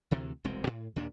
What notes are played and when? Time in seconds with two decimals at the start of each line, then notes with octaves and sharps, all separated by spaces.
0.11 D2 C3 E3
0.44 E1 C2 G#3 C4
0.67 A2
0.96 D#2 A#2 D4